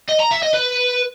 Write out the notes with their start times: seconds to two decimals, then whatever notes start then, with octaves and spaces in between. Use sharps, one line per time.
0.09 D#5
0.20 A#5
0.31 E5
0.42 D#5
0.54 B4